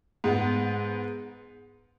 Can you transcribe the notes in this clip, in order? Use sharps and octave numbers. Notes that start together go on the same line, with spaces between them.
G#2 G#3 B3